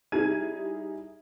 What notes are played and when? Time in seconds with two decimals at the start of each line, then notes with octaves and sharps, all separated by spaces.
0.12 G3 D#4 E4 G#4 G#6 D#7